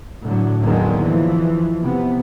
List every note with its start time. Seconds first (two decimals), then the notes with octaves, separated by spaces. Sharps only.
0.22 A2 D3 F#3
0.62 E2 D3 D#3 F#3 G#3 A#3
1.03 E3 F3
1.80 C3 B3